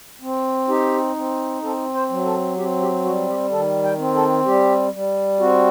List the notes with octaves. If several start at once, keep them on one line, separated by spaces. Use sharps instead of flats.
C4
D#4 G4
C4
C4 A4
C5
F#3
A4
C4 G4
G4
G3 F#4
G4
D#3 A4
G5
C4
A4
G3 G4
G3
C4 F#4